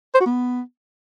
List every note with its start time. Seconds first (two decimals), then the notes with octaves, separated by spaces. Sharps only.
0.14 C5
0.20 F#4
0.26 B3